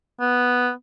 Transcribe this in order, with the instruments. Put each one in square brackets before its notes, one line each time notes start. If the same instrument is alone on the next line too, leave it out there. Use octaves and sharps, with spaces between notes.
[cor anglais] B3